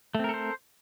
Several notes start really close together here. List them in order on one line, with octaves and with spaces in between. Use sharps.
A3 C4 A#4 A4 C5